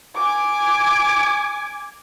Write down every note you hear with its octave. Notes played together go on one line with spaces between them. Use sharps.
G#5 D6